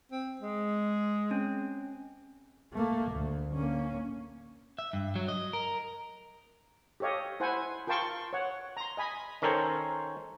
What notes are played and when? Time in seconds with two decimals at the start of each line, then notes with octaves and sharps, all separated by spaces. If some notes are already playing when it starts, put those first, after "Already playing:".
0.11 C4
0.41 G#3
1.31 C4 C#4
2.73 A3 A#3
3.11 D2
3.54 A#3 C#4
4.79 E5
4.93 G2
5.16 F#3
5.28 D#5
5.53 A#4
7.00 G4 A4 C#5 D#5 F5
7.40 E4 C5 F#5 G#5
7.87 F4 A#4 G5 A5 C6 C#6
8.33 C#5 F#5
8.77 A#5 C6
8.97 D#5 G#5 B5
9.42 D#3 C#4 A4 A#4 C5 C#5